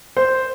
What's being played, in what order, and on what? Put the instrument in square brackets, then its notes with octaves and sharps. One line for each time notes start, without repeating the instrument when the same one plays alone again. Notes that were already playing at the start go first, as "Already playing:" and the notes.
[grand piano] C5